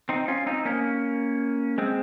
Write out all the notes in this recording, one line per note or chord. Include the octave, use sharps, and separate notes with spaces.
C4 D#4
C#4 F4
C4 D#4
A#3 C#4
G#3 C4